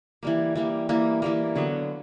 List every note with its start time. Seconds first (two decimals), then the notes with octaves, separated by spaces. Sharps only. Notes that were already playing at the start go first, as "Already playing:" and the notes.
0.23 E3 G3 A#3
0.55 E3 G3 A#3
0.89 E3 G3 A#3
1.22 E3 G3 A#3
1.56 D3 F#3 B3